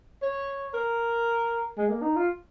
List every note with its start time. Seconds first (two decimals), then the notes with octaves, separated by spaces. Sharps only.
0.23 C#5
0.74 A#4
1.77 G#3
1.90 A#3
2.02 D#4
2.16 F4